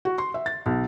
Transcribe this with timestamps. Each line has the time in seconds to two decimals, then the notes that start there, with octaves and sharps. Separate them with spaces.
0.05 F#4
0.18 C6
0.34 E5
0.46 A6
0.66 B1